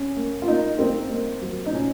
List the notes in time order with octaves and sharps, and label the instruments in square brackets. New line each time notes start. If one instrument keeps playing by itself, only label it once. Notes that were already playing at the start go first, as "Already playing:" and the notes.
Already playing: [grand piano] C#4
A#3
F4
A#3 D#4
A#3 C4
A#3
F#3
D#4
A#2 C#4